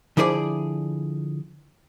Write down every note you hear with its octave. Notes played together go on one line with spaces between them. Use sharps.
D3 F3 E4 G#4 B4 D5